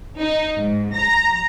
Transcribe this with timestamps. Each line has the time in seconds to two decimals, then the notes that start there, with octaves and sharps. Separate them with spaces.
0.19 D#4
0.59 G#2
0.93 A#5